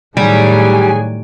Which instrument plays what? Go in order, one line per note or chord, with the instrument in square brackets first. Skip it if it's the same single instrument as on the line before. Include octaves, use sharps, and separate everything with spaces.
[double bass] A2 [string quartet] D#3 F#3 G#5 [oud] G3 [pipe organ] G#4